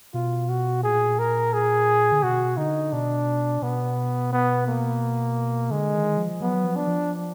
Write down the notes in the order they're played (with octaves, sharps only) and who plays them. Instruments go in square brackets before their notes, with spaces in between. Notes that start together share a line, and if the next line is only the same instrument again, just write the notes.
[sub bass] B2 [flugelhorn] F4
[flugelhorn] F#4
[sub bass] A#2 [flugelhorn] G#4
[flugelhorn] A#4
G#4
[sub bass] D3
[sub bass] B2 [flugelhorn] F#4
[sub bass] D3 [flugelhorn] D#4
[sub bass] B2 [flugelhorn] D4
[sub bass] B2 [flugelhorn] B3
[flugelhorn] B3
A#3
[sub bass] D3 [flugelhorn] G#3
[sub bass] D#3
F3
[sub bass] F#3 [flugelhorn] B3
[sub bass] F3
[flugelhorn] D4
[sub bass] F3